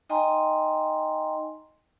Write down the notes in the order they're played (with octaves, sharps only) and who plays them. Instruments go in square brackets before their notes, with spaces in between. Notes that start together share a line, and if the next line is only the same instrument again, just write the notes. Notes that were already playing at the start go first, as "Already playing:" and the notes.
[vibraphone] D#4 D#5 G5 G#5 A#5 C6